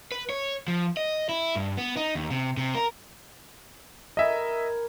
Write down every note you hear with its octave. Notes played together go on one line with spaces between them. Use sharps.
B4
C#5
F3
D#5
E4
G2
B3
D#4
D#2
C3
C3
A#4
A#4 D#5 E5 G#5 B5